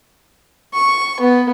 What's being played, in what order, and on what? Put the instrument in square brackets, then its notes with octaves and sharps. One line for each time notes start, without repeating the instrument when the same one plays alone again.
[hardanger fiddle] C#6
B3